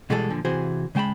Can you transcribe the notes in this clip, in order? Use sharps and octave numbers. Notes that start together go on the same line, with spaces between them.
B2 E3 G3 G#3 G#4 A4
A#2 D3 F3
C3 E3 F#4 G#4 C5
C#3 G#3 G5 A5 B5